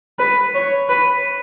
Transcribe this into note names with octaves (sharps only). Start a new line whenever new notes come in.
B4
C#5
B4